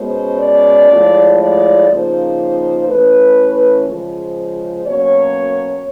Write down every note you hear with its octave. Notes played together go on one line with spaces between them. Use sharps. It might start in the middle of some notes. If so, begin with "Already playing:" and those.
Already playing: B2 G#3 C#4 C5
D5
A2 F3 G#3
D5
C#3 F3 A#3 D#4 C5
E3 A3 C#4 B4
C#3 F3 G#3 C5
B2 F#3 A#3 C#4 C#5